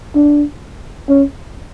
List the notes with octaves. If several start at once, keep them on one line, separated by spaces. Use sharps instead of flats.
D4
C#4